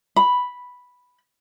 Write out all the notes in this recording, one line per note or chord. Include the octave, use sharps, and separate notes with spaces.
B5